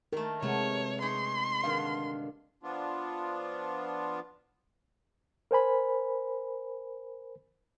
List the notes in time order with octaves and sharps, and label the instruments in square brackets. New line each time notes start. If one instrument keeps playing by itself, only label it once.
[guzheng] D#3 A3 [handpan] A#4
[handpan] C3 G#3 [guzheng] A3 B3 [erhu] C#5
[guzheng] D#4 G#4 C#5 [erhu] C6
[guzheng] G2 D3 D#3 [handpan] F5
[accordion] F3 B3 D4 F4
[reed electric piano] A#4 C5 G#5 B5